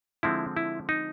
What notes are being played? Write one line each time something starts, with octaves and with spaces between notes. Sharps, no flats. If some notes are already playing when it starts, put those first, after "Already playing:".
D3 F3 G#3 C4 E4
E4
D#4